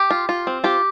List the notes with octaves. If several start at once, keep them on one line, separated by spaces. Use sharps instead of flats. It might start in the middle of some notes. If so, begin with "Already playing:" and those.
Already playing: G4
F4
F4
C4
F4 G4